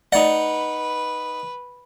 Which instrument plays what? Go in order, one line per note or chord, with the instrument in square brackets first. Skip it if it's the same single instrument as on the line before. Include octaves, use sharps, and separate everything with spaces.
[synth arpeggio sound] A3 D5 [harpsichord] D#4 F#5 [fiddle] B4